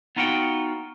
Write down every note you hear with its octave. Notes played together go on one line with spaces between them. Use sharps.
B3 D#4 F4 F#4 F#5 G5